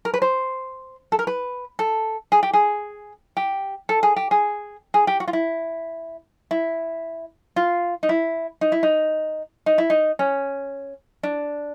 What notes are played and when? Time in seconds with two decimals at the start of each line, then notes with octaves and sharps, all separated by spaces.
0.05 A#4
0.14 B4
0.22 C5
1.12 A4
1.19 A#4
1.27 B4
1.79 A4
2.32 G#4
2.43 G4
2.53 G#4
3.37 G4
3.89 A4
4.03 G#4
4.16 G4
4.31 G#4
4.94 G#4
5.07 G4
5.20 F#4
5.28 F4
5.33 E4
6.51 E4
7.56 F4
8.03 D#4
8.09 E4
8.61 D#4
8.72 E4
8.83 D#4
9.66 D#4
9.78 E4
9.90 D#4
10.19 C#4
11.23 D4